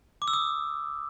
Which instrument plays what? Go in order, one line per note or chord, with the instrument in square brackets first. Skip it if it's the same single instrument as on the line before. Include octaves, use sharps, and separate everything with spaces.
[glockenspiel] D6
E6
D#6